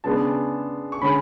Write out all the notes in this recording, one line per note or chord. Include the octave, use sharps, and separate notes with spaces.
C#3 G#3 B3 D4 A5
C#6
D3 G#3 C#4 B5